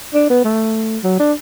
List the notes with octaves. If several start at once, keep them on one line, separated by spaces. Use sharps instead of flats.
D4
B3
A3
F#3
D4